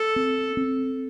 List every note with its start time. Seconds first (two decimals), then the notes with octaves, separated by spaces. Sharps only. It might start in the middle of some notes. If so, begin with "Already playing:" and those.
Already playing: A4
0.16 C4
0.57 C4